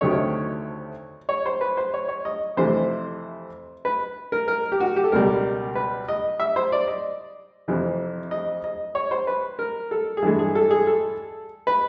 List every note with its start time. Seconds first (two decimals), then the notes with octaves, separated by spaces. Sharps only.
0.01 D2 C3 D#3 F#3 A3 C#5
1.29 C#5
1.46 C5
1.61 B4
1.77 C5
1.94 C#5
2.08 C#5
2.25 D#5
2.57 F2 C3 E3 A3 C5
3.85 B4
4.32 A#4
4.48 A#4
4.72 G4
4.80 F#4
4.96 G4
5.04 A4
5.12 C#2 B2 G3 A#4
5.75 B4
6.08 D#5
6.40 E5
6.56 C5
6.72 D5
6.88 D#5
7.68 F2 C3 E3
8.31 D#5
8.64 D#5
8.95 C#5
9.11 C5
9.27 B4
9.59 A#4
9.91 A4
10.17 G#4
10.22 G2 E3 G#3 A4
10.39 G#4
10.55 A4
10.71 G#4
10.87 A4
11.67 B4